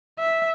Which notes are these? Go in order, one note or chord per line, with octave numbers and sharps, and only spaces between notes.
E5